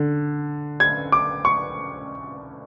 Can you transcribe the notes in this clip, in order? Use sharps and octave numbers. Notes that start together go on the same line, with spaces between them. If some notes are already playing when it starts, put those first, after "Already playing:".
Already playing: D3
G#6
D6
C#6